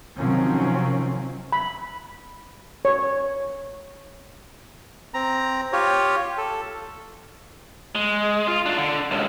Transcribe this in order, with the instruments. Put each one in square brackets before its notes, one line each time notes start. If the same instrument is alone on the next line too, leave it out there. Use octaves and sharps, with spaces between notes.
[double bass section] C3 D#3 F3 F#3 C4 C#4
[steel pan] B5
C#5
[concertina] C4 A#5
F4 G4 C#5
A4
[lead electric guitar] G#3
F4
D4 F4
D3
C#2 G2